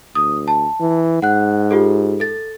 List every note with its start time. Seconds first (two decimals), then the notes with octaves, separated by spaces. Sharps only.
0.15 D2 D#6
0.48 A5
0.80 E3
1.22 G#2 F#5 F#6
1.71 F4 G4 A4
2.20 A4 A6